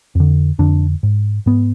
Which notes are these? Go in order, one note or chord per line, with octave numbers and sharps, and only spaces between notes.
F2 D3
F2 D3 D4
G#2
G#2 B3